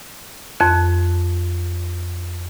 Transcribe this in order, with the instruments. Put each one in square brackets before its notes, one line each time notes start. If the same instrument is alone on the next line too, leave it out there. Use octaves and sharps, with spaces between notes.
[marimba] F2 F#6